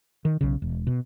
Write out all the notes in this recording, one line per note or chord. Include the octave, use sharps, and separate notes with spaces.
D#3
B1 C#3
E1
B2